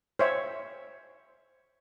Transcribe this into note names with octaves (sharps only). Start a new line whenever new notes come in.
C5 C#5 E5